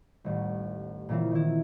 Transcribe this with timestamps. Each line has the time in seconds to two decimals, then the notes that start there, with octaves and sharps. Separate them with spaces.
0.24 D#1 A1
1.09 A#2 C#3 E3 F3 C4
1.31 D#3 E4